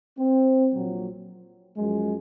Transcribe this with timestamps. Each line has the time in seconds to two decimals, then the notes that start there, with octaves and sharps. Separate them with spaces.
0.18 C4
0.71 A#1 A#2 F#3
1.77 F#2 F3 G#3